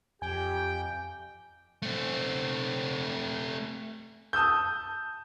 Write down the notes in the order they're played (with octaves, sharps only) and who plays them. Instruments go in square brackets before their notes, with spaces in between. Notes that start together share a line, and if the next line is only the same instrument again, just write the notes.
[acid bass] F2 [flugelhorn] G4 [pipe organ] G5 [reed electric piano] G#5
[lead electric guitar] A3 C4
[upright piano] A5 D#6 E6 G6